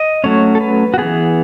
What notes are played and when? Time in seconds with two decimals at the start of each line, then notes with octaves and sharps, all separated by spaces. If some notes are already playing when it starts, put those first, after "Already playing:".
Already playing: D#5
0.24 F#3 A3 C#4 C#5
0.55 A4
0.61 B4
0.94 F#4
0.98 E3 B3 G#4